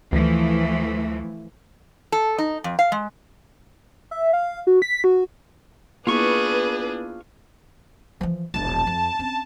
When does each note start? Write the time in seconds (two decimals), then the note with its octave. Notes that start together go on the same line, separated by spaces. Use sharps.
0.12 D2 E3 F3 A3
2.12 A4
2.38 D#4
2.64 F2
2.79 F5
2.92 G#3
4.11 E5
4.33 F5
4.67 F#4
4.82 B6
5.04 F#4
6.07 A#3 B3 D4 E4 F4 G#4 B4 C#6
8.21 E3 F3
8.54 E1 A#1 A5
8.87 F2
9.19 C4 C#4